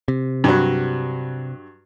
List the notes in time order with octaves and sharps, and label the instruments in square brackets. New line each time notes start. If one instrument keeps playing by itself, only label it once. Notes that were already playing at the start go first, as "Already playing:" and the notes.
[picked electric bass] C3
[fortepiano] G2 F#3